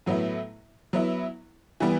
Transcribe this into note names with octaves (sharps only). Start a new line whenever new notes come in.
A2 F#3 B3 E4
F#3 B3 E4
E3 G3 B3